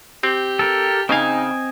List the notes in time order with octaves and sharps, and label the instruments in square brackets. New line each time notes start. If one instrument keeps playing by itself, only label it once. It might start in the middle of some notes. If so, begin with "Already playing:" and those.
[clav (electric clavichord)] C4 [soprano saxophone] G4
[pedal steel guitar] A4 A#4
[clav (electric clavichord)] C#3 F5 [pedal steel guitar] C4 D#5 G#5 [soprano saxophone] D#4